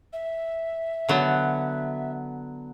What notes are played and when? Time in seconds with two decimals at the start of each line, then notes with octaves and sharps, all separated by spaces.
0.13 E5
1.09 D3 F#3 B3